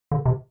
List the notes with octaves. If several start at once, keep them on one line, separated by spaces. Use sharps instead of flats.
D3
C3